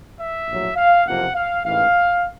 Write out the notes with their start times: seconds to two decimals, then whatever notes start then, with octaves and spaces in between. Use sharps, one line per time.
0.19 E5
0.47 A#1 A2 F#3
0.77 F5
1.06 F#1 F2 C3 F3 A#3 F#5
1.34 F5
1.64 A1 G#2 E3 F5